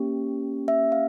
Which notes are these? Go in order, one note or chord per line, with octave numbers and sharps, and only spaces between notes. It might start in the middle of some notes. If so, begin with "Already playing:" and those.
Already playing: A#3 C#4 G4
E5
F5